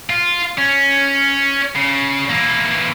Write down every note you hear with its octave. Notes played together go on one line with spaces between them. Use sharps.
F4
C#4
C#3
E3 A#3